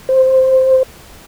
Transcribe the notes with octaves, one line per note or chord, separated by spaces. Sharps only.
C5